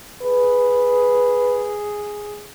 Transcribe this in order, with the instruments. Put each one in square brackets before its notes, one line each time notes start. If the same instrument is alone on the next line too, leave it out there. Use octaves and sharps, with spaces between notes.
[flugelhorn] G#4 [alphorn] B4